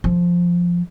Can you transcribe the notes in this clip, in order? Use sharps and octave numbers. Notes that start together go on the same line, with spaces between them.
F3